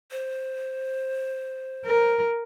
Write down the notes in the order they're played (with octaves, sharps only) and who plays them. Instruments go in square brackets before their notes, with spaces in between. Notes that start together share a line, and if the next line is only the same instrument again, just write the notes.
[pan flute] C5
[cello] A#4